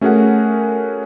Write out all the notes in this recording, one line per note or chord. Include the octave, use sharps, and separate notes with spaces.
A3 C#4 F#4 G#4 A#4 F#5